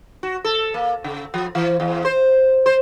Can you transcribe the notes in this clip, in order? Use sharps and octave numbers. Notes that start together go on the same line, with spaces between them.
F#4
A4
A#3
C#3
F3
E3
E2
C5
C5